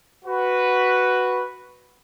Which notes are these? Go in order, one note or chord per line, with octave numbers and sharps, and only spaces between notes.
F#4 B4